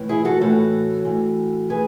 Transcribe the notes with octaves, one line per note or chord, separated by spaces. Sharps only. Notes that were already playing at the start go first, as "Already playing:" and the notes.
Already playing: A2 E3
E4 G#4
F#4 A4
A2 E3 F#4 A4
A2 E3
A2 E3 G#4 B4